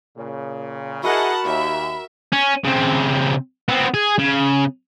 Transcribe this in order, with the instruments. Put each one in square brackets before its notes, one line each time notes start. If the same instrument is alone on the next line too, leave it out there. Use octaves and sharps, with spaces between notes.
[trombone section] A#2 C#3
[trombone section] E4 G#4 [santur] F#4 A#4 [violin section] D#5 F#5 A5 [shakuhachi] B5
[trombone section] D#2 [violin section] E5
[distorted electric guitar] C#4
C#3 C4
B3 C4
G#4
C#3